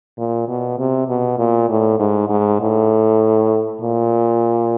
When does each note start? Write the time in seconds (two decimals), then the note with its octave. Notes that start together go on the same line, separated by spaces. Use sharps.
0.18 A#2
0.48 B2
0.78 C3
1.08 B2
1.38 A#2
1.69 A2
2.00 G#2
2.29 G#2
2.60 A2
3.81 A#2